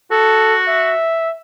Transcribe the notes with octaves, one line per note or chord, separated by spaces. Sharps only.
F#4 A4
E5